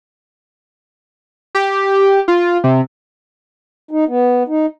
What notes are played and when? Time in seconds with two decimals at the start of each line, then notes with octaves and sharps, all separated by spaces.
1.55 G4
2.28 F4
2.64 C3
3.91 D#4
4.08 B3
4.48 D#4